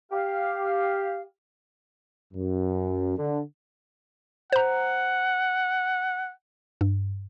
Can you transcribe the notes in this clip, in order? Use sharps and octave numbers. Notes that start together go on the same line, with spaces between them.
G4 F5
F#2
D3
C5 F#5 A#5
G2